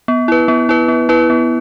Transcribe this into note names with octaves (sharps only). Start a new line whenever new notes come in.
B3
E4 B4
B3
E4 B4
B3
E4 B4
B3